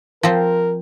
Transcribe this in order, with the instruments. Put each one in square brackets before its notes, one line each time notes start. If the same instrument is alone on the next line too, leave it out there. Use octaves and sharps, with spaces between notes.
[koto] F3 C4 [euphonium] A#4